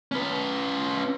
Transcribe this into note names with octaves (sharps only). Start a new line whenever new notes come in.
C#4 B4